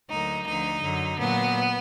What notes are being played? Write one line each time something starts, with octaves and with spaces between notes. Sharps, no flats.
D2 D3 F#3 A#3 D#4
D2 D3 F3 D#4
F#2 D3 F#3
A#2 F#3 A#3 B3